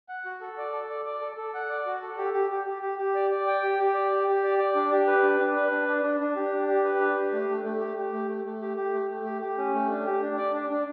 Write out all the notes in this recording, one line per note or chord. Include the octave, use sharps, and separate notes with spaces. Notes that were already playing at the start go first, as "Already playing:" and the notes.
F#5
F#4
A4
D5
A4
D5
D5
A4
A4
F#5
D5
F#4
A4
G4
G4
G4
G4
G4
G4
D5
D5
G5
G4
G4
D5
G4
G4
D5
D5
D4
G4
B4
D4
D4
B4
D4
D4
D4
D4
G4
D4
G4
B4
D4
G4
A3
A3
A3
G4
G4
A3
A3
A3
G4
G4
A3
A3
G4
G4
C#4
A3
D4
G4
D4
D5
D4
D4